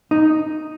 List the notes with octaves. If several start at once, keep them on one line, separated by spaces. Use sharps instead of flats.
D#4